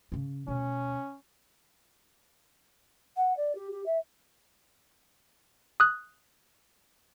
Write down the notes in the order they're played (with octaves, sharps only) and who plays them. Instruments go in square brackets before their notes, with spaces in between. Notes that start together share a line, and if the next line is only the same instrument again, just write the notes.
[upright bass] C#3 C#4
[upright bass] D2 B2 [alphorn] C#4
[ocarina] F#5
D5
G4
G4
E5
[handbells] D#6 F#6